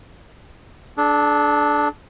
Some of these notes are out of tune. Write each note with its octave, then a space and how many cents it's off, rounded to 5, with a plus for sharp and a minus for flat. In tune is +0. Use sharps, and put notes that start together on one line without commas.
D4 +0 A4 -45